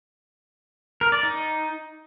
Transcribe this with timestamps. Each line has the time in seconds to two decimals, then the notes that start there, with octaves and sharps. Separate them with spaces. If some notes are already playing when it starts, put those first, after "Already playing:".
1.01 A#4
1.12 D5
1.23 D#4